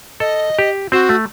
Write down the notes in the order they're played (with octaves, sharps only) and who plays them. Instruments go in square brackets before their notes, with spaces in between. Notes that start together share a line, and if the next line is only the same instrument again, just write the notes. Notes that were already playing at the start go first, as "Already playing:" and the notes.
[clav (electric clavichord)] A4 [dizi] D#5
[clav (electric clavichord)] G4
[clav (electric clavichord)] C4 C5 [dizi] F#4
[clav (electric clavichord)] A3